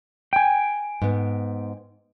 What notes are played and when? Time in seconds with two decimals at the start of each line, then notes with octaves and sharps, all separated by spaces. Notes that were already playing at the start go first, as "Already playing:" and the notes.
0.33 G5 G#5
1.02 G#2 B3